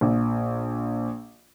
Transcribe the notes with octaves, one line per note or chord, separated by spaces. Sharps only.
A#1